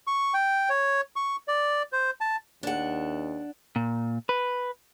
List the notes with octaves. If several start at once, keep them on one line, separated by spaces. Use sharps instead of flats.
C#6
G5
C#5
C#6
D5
C5
A5
D#2 D4 F#5
A#2
B4